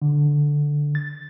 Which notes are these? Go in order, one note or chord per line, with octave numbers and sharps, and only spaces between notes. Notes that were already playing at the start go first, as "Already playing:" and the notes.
D3
A6